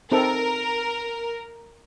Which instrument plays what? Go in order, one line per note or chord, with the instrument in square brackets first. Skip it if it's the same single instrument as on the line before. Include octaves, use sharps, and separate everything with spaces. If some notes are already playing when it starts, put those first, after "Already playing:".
[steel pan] C4 D#4 A4 [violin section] A#4